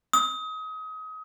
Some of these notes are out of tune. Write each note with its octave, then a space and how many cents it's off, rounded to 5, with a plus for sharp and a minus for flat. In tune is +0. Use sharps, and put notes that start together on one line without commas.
D#6 +30